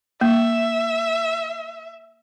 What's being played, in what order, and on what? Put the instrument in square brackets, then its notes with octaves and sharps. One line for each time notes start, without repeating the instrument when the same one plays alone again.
[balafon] A#3 [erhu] E5